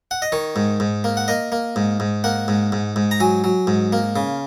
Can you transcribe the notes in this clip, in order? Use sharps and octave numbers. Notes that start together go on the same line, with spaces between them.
F#5
D#5
D#3 C#5
G#2
G#2
A#3
F#5
A#3 D#5
A#3
G#2
G#2
A#3 F#5
G#2
G#2
G#2
A#5
F#3 G#5
F#3
G#2
A#3
C#3